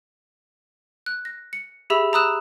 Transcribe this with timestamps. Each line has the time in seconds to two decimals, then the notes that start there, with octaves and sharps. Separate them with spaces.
1.06 F#6
1.25 A#6
1.53 C#7
1.90 G4 G#4 E5 B5 E6 F7
2.13 A#5 B5 D#6 E6 F#6 E7